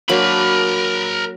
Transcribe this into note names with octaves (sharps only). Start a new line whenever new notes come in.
F#3 A#3 D4 A#4 B5